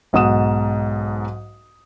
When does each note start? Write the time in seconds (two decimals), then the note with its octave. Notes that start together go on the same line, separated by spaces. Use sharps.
0.13 B1 G#2 F#5 D#6 E7